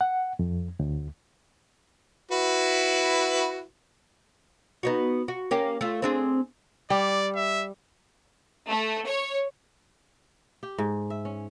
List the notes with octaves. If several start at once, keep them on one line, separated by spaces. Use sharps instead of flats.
F#5
F2
D2
E4 F#4 B4
B3 D#4 F#4
F#4
A#3 C#4 G4
A3 F4
C4 D4 G#4
G3 D5
E5
A3
C#5
G4
G#2
E5
C#4